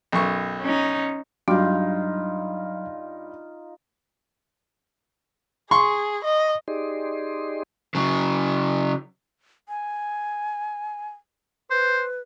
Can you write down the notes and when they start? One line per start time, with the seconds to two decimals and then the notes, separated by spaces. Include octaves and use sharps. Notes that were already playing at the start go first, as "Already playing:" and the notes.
0.12 B1 F#2 C#6
0.62 C#4 D#4
1.48 G2 F#3 D#4 F4 F#4
5.71 G#4 C6 C#6
6.25 D#5
6.68 D#4 G4 G#4 D5 D#5 C6
7.95 C#3 F#3
9.69 G#5
11.71 B4 C5